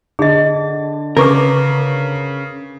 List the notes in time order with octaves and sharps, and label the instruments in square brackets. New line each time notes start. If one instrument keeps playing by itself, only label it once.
[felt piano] D3 [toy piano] G#4 D#5
[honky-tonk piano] C#3 [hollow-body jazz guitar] A#4 [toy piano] B4 C#6 D6